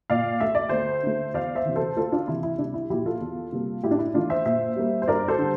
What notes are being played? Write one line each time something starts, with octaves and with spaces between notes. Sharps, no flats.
A#2 D5 F5
A3 E5
D5
D2 C5 E5
D3 A3
E2 D5 F5
C5 E5
C3 E3
A4 C5
D2 F4 A4
D4 F4
C3 E3 E4
E4
C2 D4
E4
A#2 F3 E4 G4
F4 A4
E2
C3 G3 A#3
A2 E4 G4
D4
E4
E3 A3 D4 F4
C5 E5
A#2 C5 E5
G3 A#3
C5
G2 A#4 D5
A4 C5
D3 G3